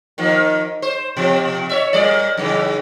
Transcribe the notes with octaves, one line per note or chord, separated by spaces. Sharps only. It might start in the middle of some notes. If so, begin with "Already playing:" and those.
D#3 F3 A#3
C5
B2 F3
C#5 D5 E5
A#2 G3 D5
F#2 C#3 E3